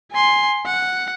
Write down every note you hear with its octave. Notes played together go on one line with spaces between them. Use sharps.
G#5 C6
F#5